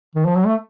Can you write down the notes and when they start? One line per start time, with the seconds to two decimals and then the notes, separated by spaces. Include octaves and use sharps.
0.15 D#3
0.25 F3
0.36 F#3
0.46 A3